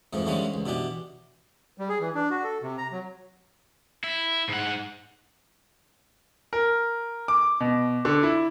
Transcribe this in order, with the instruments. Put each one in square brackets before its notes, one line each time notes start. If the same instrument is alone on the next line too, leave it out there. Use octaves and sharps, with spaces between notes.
[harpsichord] F2 G#2 E3 F3
D3 E3 F3 G3 G#3 C#4
C#2
B2 E3 D4 G4
[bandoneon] G3
G#4
E3
D4
F#4
A4
C3
A#5
F#3
[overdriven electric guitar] E4
G#2 F#5
[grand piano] A#4
D6
B2
D3
E4